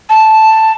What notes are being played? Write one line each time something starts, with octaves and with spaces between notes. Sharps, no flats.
A5